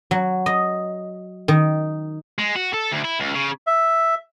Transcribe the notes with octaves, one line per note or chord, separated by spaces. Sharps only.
F#3
D#5
D#3
G#3
F#4
A4
D2
E4
C#2
C#3
E5